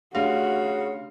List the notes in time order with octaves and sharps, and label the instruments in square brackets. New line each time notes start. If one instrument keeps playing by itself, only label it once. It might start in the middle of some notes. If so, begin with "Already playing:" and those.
[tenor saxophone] C#3 [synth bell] A3 D4 G4 [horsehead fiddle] F#4 [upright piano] F5